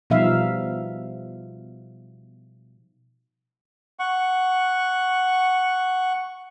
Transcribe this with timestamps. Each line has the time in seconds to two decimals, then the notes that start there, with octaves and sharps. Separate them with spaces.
0.10 B2 F3 G3 D#4 E5 F5
3.99 F#5 C#6